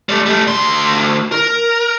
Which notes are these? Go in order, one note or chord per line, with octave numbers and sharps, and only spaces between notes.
G3 A3
G3 A3
D2 C6
A#4